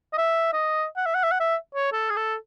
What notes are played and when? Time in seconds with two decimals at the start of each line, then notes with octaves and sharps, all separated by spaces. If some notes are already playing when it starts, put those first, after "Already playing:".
0.13 D#5
0.18 E5
0.53 D#5
0.96 F#5
1.06 E5
1.15 F#5
1.23 E5
1.31 F#5
1.40 E5
1.75 C#5
1.92 A4
2.10 G#4
2.16 A4